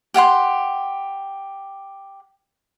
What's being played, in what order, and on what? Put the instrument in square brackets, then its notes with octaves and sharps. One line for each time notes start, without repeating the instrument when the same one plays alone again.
[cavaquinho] G4 F#5 G5 C6